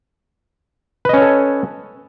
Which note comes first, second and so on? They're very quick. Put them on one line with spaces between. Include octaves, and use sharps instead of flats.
B4 D#5 C#4 C#5 A4